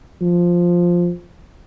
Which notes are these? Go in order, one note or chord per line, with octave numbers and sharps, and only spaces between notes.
F3